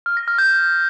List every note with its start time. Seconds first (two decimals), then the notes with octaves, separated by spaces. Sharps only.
0.06 F6
0.17 A#6
0.28 F6
0.38 G6